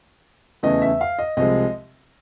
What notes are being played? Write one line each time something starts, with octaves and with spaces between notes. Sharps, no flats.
E2 C#3 E3 A3 D#5
E5
F5
D#5
C2 C3 F3 G#3 D#5